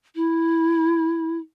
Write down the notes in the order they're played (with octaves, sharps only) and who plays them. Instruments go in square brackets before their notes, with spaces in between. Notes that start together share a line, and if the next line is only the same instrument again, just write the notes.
[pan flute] E4